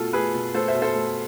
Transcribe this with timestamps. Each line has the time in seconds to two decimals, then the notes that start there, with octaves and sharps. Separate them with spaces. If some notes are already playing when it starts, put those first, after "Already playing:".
Already playing: B2 A3 F4 A4
0.13 A3 G#4 B4
0.34 B2
0.54 A3 A4 C5
0.68 C5 E5
0.75 B2
0.82 A4 C5
0.95 A3